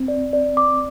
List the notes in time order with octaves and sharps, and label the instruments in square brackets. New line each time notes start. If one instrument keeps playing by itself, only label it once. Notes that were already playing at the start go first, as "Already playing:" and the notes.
Already playing: [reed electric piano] C4
[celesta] D5
D5
D6